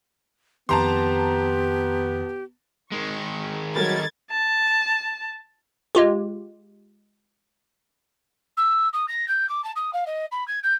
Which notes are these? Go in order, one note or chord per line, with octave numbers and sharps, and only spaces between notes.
F2 D#3 B3 G4 A5 A#5 C6
D#3 G#3 C#6
F#3 G3 A3 A#4 G#6 A6
A5
G#3 F4 G4
E6
D#6
A#6
G6
D6
A5
D#6
F5
D#5
B5
G#6
G6